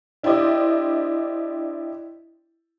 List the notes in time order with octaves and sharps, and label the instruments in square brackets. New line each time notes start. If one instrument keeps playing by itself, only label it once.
[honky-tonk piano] D4 E4 G4 C5 D5 D#5